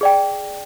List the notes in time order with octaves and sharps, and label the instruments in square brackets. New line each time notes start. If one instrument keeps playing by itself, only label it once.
[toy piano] G#4 D5 G5